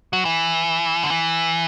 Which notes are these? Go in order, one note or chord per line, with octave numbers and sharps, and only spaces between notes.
F#3
E3
D3
E3